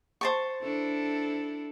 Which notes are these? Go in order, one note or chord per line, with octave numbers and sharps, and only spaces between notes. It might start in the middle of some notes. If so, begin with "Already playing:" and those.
C5 A5 C#6
D4 E4 A4